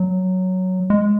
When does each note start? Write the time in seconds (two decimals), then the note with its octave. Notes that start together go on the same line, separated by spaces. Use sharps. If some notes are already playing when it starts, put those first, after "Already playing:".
Already playing: F#3
0.90 G#3